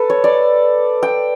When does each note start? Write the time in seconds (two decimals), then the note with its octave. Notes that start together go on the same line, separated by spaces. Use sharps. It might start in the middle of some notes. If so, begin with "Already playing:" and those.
Already playing: A4 B4
0.10 C#5
0.24 D5
1.03 G5